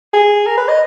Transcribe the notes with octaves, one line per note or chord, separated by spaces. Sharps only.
G#4
A#4
B4
D#5